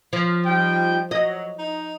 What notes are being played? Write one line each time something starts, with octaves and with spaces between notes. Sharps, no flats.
F3
G3 D#4 G5
F#3 D#5
D#4